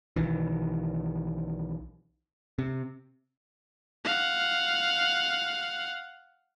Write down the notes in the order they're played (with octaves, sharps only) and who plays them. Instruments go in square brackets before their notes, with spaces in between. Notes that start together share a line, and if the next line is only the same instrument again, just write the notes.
[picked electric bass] B1 D#3 E3
C3
[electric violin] F5 F#5